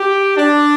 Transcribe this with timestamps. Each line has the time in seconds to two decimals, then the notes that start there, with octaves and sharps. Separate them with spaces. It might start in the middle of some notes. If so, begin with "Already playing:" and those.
Already playing: G4
0.37 D4